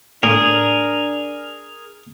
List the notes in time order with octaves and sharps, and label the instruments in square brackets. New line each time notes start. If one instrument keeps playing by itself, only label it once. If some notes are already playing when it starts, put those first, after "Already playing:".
[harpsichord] A2 [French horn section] D4 [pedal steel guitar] G#4 A#4